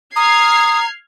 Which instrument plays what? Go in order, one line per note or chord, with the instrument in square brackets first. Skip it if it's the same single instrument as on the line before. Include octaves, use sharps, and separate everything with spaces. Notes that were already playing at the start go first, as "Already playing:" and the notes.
[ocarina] A#5 [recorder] D#6 [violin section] F6 G#6 C7